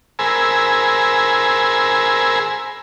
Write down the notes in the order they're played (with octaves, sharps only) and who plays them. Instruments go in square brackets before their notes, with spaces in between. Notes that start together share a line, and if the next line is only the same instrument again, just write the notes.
[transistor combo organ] G#4 A#4 C5 G#5 B5 E6